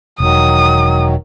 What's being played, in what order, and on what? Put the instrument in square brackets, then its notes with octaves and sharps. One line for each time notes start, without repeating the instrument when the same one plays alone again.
[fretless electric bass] E1 [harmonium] D#3 F#3 [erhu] D#6